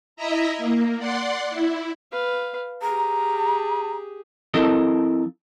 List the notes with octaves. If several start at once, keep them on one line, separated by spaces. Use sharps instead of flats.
E4 D#5 E5 A#5
A#3
D5 F#5 C6
E4
B4 F5
G4 G#4 A#5
F3 C4 E4 A4 A#4 D#5